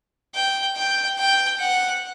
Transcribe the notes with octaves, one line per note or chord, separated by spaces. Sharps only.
G5
G5
G5
F#5